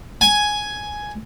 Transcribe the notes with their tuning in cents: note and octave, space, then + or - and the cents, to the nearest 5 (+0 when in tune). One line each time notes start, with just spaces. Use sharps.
G#5 +5